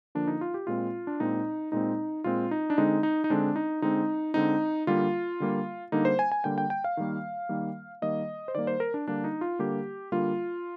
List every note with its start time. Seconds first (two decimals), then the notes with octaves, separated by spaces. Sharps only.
0.15 D3 F3 A#3 D4
0.27 D#4
0.41 F4
0.54 G4
0.67 A#2 G#3 C4 F4
1.07 D4
1.20 A#2 G#3 C4 D#4
1.72 A#2 G#3 C4 D#4
2.24 A#2 G#3 C4 F4
2.51 D#4
2.70 D4
2.78 D3 G#3 C4 D#4
3.03 D#4
3.24 D#4
3.30 D3 G#3 C4 D4
3.56 D#4
3.82 D3 G#3 C4 D#4
4.34 D3 G#3 C4 D#4
4.87 D3 G3 A#3 F4
5.40 D3 G3 A#3
5.92 D3 G3 A#3 D#4
6.05 C5
6.19 G#5
6.32 G#5
6.44 D3 G3 A#3 G5
6.58 G5
6.70 G5
6.84 F5
6.97 D#3 G3 A#3
7.49 D#3 G3 A#3
8.02 D#3 G3 A#3 D#5
8.48 C5
8.55 D#3 G3 A#3 D5
8.67 C5
8.80 A#4
8.94 D4
9.07 D3 G3 A#3 D4
9.24 D#4
9.41 F4
9.59 D3 G3 A#3 G4
10.12 D3 G3 A#3 F4